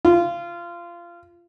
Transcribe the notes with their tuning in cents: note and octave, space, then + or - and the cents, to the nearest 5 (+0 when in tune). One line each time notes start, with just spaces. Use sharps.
F4 -20